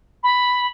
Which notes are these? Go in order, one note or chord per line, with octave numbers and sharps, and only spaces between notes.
B5